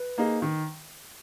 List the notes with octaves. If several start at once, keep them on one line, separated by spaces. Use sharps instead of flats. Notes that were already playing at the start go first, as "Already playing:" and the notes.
Already playing: B4
A#3 D#4 G#4
D#3